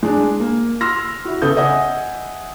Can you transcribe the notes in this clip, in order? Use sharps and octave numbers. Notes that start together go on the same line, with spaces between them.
G#3 D4
A#3
C6 E6 F6 A#6
E4 F#4
C#3 B3 A4 D#6 G6
D#5 E5 F#5 G#5 D#6